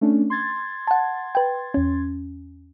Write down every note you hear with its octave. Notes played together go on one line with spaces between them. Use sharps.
A3 C#4 D4
C6 G#6 A6
F#5 A5
B4 G5
E2 C#4